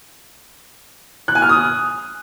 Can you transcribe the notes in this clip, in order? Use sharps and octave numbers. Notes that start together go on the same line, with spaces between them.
F#6
G#5
F6
D#6